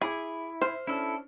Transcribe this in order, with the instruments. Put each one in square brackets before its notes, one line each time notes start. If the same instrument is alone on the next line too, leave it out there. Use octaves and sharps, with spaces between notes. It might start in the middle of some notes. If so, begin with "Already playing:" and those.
[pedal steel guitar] E4 [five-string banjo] G#4 [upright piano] B5 D6
[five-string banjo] C5 [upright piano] E5 F6
[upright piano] C#4 D4 [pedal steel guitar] E4 A4